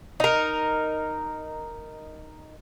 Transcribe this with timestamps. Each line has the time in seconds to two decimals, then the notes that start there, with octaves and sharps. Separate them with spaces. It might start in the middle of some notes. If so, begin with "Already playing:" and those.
0.20 D#4 A#4